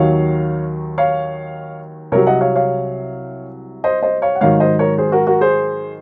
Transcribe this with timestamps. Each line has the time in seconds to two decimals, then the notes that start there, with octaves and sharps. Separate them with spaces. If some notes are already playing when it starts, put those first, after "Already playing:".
Already playing: D#2 D#3 F#3 C#5 F5
0.98 C#5 F5
2.12 C2 C3 F#3 A#4 C#5
2.27 D#5 F#5
2.41 C#5 F5
2.55 C#5 F5
3.84 C5 D#5
4.02 C5 D#5
4.22 C#5 F5
4.35 F#5
4.41 G#2 D#3 F#3 C#5 F5
4.60 C5 D#5
4.79 A#4 C#5
4.98 G#4 C5
5.12 F#4 A#4
5.27 F#4 A#4
5.41 G#4 C5